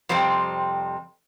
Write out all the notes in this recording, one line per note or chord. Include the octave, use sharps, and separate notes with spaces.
F2 C3 G3 C4